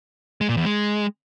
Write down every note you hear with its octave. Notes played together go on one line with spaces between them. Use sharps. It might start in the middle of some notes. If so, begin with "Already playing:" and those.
G#3
A#2
E2
G#3